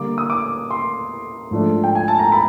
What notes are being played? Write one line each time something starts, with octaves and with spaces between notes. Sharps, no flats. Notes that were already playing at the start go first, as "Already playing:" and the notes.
Already playing: D3 G3 A#3 D6
D#6
D6
C6
G#2 F3 A3 D4
G5
G#5
A5
A#5
B5